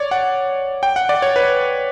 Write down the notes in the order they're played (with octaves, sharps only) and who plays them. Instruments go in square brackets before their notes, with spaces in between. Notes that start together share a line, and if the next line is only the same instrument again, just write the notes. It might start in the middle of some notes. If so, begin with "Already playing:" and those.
Already playing: [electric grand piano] C#5 D5
F#5
G5
F#5
D5
C#5
B4